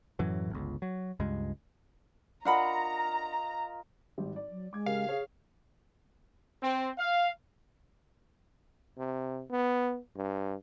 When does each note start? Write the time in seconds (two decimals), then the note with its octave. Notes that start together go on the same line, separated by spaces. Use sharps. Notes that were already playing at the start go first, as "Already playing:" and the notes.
0.19 F#2 A2 E3 F#3
0.50 G1 C#2
0.82 F#3
1.20 C#2 G2 G#3
2.45 D4 F4 A#4 D#5 F#5 A#5 B5
4.18 G#1 G3
4.36 D5
4.51 F#3
4.73 G#3 D6 G#6
4.86 C#3 G4 A#4 F5
5.08 G#4 C#5
6.63 C4
6.98 F5
8.98 C3
9.50 B3
10.16 G2